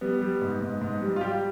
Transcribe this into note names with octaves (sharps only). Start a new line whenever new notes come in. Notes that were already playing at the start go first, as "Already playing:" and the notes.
G3 B3
G3
G#2
G#2
G#2
G3
F4
G3 G4